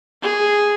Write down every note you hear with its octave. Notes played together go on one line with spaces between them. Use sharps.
G#4